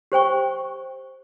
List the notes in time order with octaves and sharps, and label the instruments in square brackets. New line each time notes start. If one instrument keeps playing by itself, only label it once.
[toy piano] G4 C5 G5 C#6